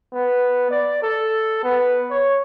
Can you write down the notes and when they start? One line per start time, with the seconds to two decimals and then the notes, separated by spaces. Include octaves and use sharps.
0.13 B3
0.70 D5
1.03 A4
1.63 B3
2.10 C#5